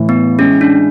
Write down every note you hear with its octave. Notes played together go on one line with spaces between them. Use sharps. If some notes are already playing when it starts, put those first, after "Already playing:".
Already playing: A2 E3
B3
G#3 C#4
D4